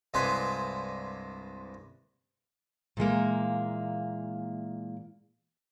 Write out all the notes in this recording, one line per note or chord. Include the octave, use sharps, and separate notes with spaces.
C2 G2 G#3 B4 C5 G#5
A#2 E3 G#3 A#3